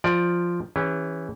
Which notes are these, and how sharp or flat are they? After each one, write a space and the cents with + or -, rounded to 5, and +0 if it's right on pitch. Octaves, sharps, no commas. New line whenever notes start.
F3 +0 D5 +10
E3 +0 C#4 +5 G4 +45